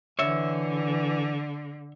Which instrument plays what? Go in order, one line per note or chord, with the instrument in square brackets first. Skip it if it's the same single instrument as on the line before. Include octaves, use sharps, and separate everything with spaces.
[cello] D3 [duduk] E3 [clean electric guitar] C#5 E5